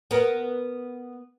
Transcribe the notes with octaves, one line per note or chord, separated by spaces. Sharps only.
B3 A#4